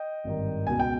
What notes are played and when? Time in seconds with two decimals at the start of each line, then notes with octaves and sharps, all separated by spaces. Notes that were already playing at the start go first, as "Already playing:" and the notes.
Already playing: D#5 G5
0.24 G#1 G2 D#3
0.67 C#2 B2 G#5
0.80 G5